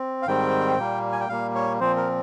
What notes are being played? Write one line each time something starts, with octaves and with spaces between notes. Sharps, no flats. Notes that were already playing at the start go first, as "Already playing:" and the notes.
Already playing: C4
F5
G#2 D#3 G3 C4 G5
A#2 G3 A#3
G#5
G5
A#2 G3 A#3 F5
C#5
A#2 F3 C4 C5
A#4